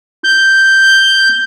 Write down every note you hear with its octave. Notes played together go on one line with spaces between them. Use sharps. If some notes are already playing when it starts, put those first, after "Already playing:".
G6